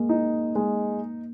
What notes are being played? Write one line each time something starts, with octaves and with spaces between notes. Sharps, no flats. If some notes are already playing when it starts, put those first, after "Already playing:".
Already playing: G#3 A#3
D#4
G#3